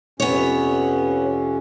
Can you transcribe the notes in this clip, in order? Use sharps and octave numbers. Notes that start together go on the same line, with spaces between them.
F2 C3 B3 C#4 C#5